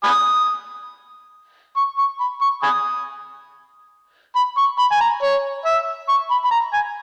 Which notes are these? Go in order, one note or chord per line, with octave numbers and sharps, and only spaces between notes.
G#5 B5 D#6
C#6
C#6
B5
C#6
G#5 B5 D#6
B5
C#6
B5
G#5
A#5
C#5
E5
C#6
B5
B5
A#5
G#5